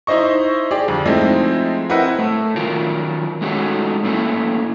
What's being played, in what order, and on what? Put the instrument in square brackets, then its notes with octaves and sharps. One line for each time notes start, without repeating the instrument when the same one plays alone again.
[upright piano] D#4 E4 C5 D#5 C#6
G4 G#4 D5
F2 D3
F3 G#3 A3 C4 D#4 E4
C4 E4 A#4 B4 D#5 F#5
[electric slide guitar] A2 A3
D#3 F#3 F4 A#4
G#3 A3 C#4 D#4 F#4 G#4
A2 A3 A#3 C#4 E4